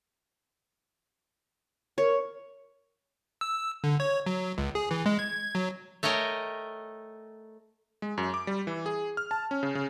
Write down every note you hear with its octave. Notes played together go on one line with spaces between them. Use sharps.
A#4 C#5
E6
D3
C#5
F#3
C#2
G#4
E3
G#3
G#6
F#3
A3 A#4 C#5 D#5 G5
G#3
F#2
D6
G3
E3
G#4
F6
A5
C#4
C#3
C#3